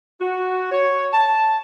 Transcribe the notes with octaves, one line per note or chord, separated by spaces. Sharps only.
F#4
C#5
A5